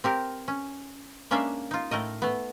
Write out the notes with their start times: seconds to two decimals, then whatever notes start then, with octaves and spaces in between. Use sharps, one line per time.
0.04 C4 G4 A#4
0.48 C#4
1.31 G#3 A#3 C#4 D4 E5 F5
1.71 D#4 F4
1.91 A2 A3 A#4 D#5
2.22 A3 B3